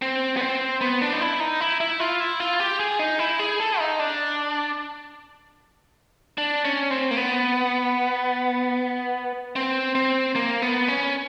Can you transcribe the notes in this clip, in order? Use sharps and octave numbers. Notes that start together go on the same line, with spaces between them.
C4
B3
C4
B3
D4
D#4
E4
D#4
E4
E4
F4
E4
F4
G4
G#4
D#4
E4
G#4
A4
D#4
D4
D4
C#4
C4
A#3
B3
C4
C4
A#3
B3
C#4